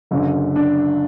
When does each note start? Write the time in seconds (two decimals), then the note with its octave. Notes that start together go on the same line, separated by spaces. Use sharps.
0.11 F#1 F#2 D3
0.56 D4